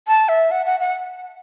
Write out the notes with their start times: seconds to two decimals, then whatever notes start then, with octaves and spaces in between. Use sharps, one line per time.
0.08 A5
0.29 E5
0.51 F#5
0.66 F#5
0.80 F#5